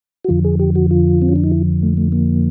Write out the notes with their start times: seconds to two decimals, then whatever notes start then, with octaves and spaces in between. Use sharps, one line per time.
0.24 F#4
0.28 F2 D3 F3 F4
0.45 G#4
0.59 G4
0.75 F#4
0.91 F4
1.22 C4
1.29 C#4
1.36 D4
1.44 D#4
1.52 E4
1.83 A3
1.97 A3
2.12 A#3